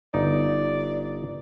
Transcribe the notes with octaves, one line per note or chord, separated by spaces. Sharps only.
G1 D#4 D5